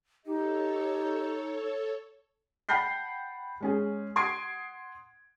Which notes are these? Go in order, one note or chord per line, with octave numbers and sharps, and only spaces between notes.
D#4 G4 A4 C#5 D#5
F#5 G5 A5 B5 G6 C7
G#3 C#4 G#4
F#5 C6 D#6 G#6 D7